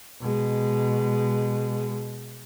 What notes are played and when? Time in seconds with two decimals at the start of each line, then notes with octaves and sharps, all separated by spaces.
0.21 B2 G#3